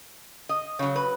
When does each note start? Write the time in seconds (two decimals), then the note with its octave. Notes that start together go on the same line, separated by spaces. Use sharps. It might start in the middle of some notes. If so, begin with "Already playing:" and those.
0.49 D#5
0.79 C#3 F#3 C#5
0.96 B4